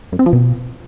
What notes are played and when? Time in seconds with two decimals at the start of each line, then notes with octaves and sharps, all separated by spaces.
0.12 F#2
0.19 C4
0.26 F3
0.33 B2